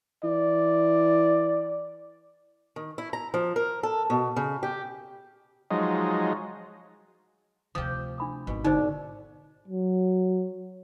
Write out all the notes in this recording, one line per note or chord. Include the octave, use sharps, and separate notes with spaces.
E3 D5
D#3
E4
A#5
F3
A#4
A4
B2
C#3
G4
F3 F#3 G#3 D#4
D2 C3 F3 G4 D#6
D4 B5 D#6
G#1 B2
D3 D#4 C5
F#3